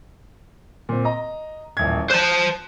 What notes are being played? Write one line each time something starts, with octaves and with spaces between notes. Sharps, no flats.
A#2 C4
D#5 A#5
D#1 A1 G#6
C5 A5 F#6